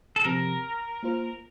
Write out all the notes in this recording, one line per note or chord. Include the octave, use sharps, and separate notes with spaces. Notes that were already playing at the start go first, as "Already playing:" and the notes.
A4
C3 F3 C4 G4 A#4
A#3 F4 C5